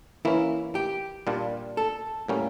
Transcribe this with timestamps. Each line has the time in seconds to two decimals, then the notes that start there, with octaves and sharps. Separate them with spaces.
0.25 E3 A#3 C#4 E4
0.75 G4
1.27 A#2 G3 D4 F4
1.77 A4
2.28 A2 G3 A#3 C#4